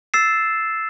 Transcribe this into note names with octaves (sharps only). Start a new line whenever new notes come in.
E6 A6 C7 E7